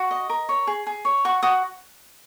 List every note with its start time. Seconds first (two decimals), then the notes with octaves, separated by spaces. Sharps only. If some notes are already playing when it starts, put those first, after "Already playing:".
Already playing: F#4
0.11 D#5
0.30 A#4
0.49 C#5
0.67 G#4
0.87 G#4
1.05 C#5
1.25 F#4 C#6
1.43 F#4 D#6